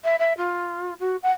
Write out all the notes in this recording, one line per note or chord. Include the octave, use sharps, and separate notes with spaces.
E5
E5
F4
F#4
F#5